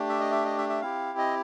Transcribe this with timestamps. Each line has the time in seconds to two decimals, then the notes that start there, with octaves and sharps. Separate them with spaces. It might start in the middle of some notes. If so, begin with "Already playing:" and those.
Already playing: A3 D4 G4
0.09 E5
0.20 D#5
0.32 E5
0.45 D#5
0.58 E5
0.70 E5
0.82 C4 E4 G4 F5
1.18 D#5